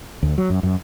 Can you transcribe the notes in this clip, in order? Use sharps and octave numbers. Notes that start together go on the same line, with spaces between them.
D2
F#3
F#2
F#2